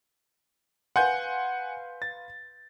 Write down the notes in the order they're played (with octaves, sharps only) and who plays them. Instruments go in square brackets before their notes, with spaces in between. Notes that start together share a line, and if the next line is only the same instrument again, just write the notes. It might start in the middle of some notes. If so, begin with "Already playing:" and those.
[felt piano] B4 F5 C6 [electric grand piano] F#5 G#5 G6
[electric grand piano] A6